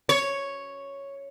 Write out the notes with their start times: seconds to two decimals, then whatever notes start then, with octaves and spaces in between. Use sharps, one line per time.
0.09 C#5